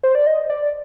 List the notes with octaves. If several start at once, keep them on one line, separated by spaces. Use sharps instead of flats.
C5
D5
D#5
D5